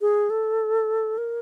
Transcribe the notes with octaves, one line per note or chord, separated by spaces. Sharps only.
G#4
A4
A#4